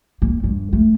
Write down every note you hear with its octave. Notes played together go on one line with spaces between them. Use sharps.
A#3
G2
A3